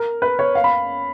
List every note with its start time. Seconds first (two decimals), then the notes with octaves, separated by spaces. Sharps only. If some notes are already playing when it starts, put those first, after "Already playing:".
Already playing: A#4
0.22 B4
0.39 C#5
0.55 F5
0.64 B5